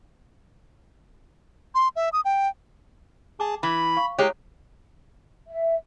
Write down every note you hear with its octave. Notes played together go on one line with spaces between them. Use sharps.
C6
E5
D#6
G5
G#4 A5 D6
E3 B5
F5 C#6
G#3 E4 G4 C#5
E5